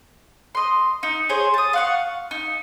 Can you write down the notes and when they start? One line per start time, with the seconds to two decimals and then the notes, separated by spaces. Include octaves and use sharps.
0.55 D#5 C6
1.03 D#4
1.29 G#4 C5 C#5
1.54 A5 D#6
1.73 F5 F#5 C#6
2.31 D#4